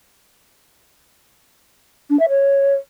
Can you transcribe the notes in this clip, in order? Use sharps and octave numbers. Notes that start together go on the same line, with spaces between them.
D4
E5
C#5